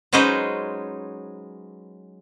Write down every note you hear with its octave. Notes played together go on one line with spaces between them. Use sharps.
F#3 G#3 C#4 D#4 B4 C5